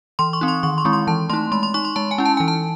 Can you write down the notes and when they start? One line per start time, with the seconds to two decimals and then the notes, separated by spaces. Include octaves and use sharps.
0.19 E3 C6
0.33 C#6
0.41 C4 D#4
0.48 C6
0.63 D#3 C#6
0.78 C6
0.85 G#3 C4 E4
0.93 C6
1.07 E3 A5
1.30 A3 D#4 C6
1.52 G#3 C6
1.63 C6
1.74 D#4 C#6
1.85 C6
1.96 G#3 A5
2.11 G#5
2.18 C#4 E4
2.25 A5
2.37 E3 G#5
2.48 A5